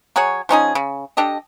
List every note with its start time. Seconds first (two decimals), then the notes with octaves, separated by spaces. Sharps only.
0.16 F#3 F#4 G#4 C#5
0.49 F3 C#4 D#4 G#4
0.75 C#3
1.17 D4 G4 A4 D#5